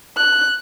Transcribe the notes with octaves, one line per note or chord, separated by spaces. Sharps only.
F#6